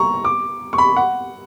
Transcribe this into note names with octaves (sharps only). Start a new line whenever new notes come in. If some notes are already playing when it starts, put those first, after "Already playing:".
Already playing: A#5 C#6
D6
C#6
B5
F#5